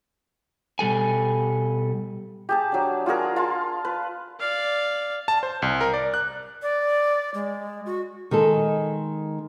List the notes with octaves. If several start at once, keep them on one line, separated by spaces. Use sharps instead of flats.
B2 G3 A4 G#5
G4 G#4 A5
F#3 D4
F4 F#4 G#4 A#4
F4 A5 C6
B4
D5 F5
A5
C5
C2
A#4
D5
F#6
D5
G#3
F#4
D#3 G#3 G#4 A4